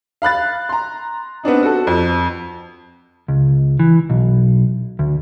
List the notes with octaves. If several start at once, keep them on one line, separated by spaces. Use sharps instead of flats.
F5 B5 F#6 A6
A#5 C6
B3 C4 D4 D#4
F#4 A4
F2
C#2
E3
B1
D2